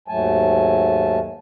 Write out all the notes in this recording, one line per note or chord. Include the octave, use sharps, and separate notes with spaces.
D#2 G#2 F#3 A3 G#5 A5